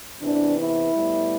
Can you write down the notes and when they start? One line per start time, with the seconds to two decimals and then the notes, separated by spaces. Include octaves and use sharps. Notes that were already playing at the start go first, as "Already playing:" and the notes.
0.21 E2 C3 E3 D4
0.58 E4
0.92 A2 G3 B3